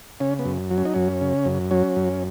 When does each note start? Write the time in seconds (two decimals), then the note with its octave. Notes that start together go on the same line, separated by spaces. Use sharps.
0.20 C#3 C#4
0.39 B3
0.45 F#2
0.71 F#3
0.78 C#4
0.85 D#4
0.94 F#2 C#4
1.21 C#3
1.45 F#2
1.71 F#3 C#4
1.96 F#2